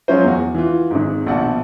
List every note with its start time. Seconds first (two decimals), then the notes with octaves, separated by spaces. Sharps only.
0.08 F3 F#3 G#3 C#4 F4 C5
0.24 E2 F#4
0.54 E3 F4
0.91 G#1 G#2
1.27 A#1 B2 F#5 A5